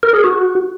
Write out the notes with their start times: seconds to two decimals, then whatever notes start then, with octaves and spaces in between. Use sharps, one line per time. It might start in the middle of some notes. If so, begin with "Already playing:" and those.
0.03 A#4
0.14 G#4
0.24 F#4